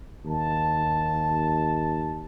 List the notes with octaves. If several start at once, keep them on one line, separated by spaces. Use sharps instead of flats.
D#2 A5